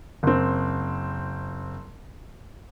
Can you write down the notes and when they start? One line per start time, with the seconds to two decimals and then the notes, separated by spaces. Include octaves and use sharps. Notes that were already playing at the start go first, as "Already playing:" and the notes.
0.23 F#1 C4